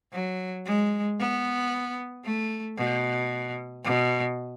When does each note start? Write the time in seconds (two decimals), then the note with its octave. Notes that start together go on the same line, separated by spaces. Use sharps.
0.13 F#3
0.66 G#3
1.19 B3
2.25 A3
2.77 B2
3.84 B2